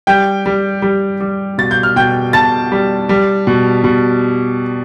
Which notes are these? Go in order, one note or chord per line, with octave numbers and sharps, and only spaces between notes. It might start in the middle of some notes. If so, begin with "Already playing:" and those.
G3 G5 G6
G3
G3
G3
B2 A6
G6
F6
B2 G5 G6
B2 A5 A6
G3
G3
B2
B2